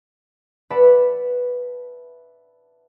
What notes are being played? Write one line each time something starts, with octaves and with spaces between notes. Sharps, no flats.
B4 D5 E5 F#5 A5 B5